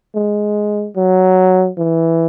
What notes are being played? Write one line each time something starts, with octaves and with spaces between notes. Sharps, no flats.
G#3
F#3
E3